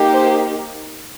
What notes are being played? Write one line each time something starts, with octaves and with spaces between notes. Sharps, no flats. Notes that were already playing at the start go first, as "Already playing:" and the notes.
Already playing: A#3 D#4 G4
C5